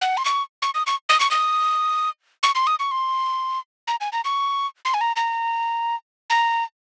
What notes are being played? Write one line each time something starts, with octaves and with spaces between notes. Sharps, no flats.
F#5
C6
C#6
C#6
D#6
C#6
D#6
C#6
D#6
C#6
C6
D#6
C#6
C6
A#5
G#5
A#5
C#6
C6
G#5
A#5
A#5
A#5